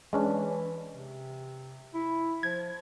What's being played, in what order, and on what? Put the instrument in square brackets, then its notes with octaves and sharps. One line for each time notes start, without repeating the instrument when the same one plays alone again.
[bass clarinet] E3 [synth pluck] G#3 C#4 D4
[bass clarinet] C3
E4
[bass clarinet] F3 [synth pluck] G#6